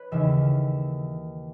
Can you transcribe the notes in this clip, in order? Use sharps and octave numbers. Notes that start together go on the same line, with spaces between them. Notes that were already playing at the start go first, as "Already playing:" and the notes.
Already playing: B4 C#5
D#2 C#3 E3 E5